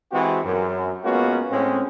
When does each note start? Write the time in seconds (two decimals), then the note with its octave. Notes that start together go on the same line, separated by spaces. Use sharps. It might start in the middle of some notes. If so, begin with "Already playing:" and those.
0.12 E3 G#3 C4 E4 F#4 G4
0.44 F#2
1.04 G#3 A#3 B3 C#4 F4 F#4
1.51 A2 G#3 C4 C#4